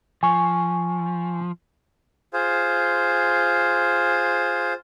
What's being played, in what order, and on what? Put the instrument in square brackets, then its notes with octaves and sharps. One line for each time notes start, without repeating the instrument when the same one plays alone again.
[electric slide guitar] F3 [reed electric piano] G#5 C#6
[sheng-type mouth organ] F4 G#4 C5